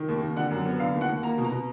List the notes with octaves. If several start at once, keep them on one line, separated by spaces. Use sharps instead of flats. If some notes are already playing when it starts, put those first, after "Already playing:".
Already playing: D#3
D#2
D#2
D3 F#5
F#2
B3
D3 F5
D#2
F#5
D#2
A#3 A#5
B2
A#5
B2